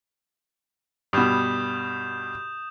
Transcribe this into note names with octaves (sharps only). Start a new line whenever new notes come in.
G2 B2 D#6 G6 E7